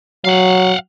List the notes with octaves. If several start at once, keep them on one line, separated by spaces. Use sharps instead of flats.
F#3 F5 F#5